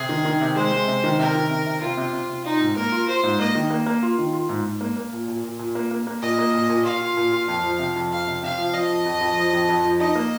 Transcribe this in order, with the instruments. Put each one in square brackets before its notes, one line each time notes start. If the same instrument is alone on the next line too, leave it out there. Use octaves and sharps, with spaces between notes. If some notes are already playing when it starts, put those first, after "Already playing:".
Already playing: [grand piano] C3 [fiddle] G#4
[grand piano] D#3
D#3
C3
[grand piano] G#3 [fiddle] C5
[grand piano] G#3
C3
D#3
[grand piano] C3 [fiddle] A#4
[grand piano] D#3
C3
C3
[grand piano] C3 [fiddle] F4
[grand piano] C3
C3
C3
[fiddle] D#4 [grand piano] F4
[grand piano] G#2
[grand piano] A#3 [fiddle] A#4
[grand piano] F4
[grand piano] F4 [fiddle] C5
[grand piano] G#2
[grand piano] A#3 [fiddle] D#5
[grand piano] D#3
A#3
A#3
F4
D#3
F4
G#2
G#2
A#3
A#3
A#2
A#2
A#2
A#2
A#3
A#3
A#3
[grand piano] A#2 [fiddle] D#5
[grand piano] A#3
A#2
A#2
[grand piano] F4 [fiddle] F5
[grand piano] F4
A#2
F4
F2
F3
C3
F2
[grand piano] F2 [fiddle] F5
[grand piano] C3
[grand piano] C3 [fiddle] F5
[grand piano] F3
[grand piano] F3 [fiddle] D#5
[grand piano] F2
F2
F2
F3
F2
F2
F3
[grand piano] D#4 [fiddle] D#5
[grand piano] A#3